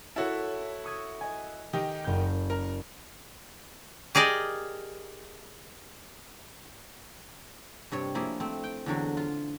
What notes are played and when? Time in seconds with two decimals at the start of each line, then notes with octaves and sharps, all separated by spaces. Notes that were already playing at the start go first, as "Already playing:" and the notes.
0.16 E4 F#4 A4 C#5 A5
0.84 C#6 D#6 G#6
1.21 D#5 G#5
1.73 D#3 D#4 G4
2.04 F#1 G6
2.50 A#4
4.15 G4 G#4 A#4 D5 D#5
7.92 G2 C3 C#5
8.15 F3 A#3 E4 G#4
8.40 A3 C4
8.64 G5
8.86 E2 D3 F#3 F#4
9.17 F4